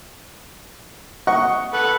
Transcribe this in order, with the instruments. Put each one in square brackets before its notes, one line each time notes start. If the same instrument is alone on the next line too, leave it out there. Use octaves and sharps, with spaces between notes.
[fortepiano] D#5 F#5 C#6
[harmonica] A4 B4 F#5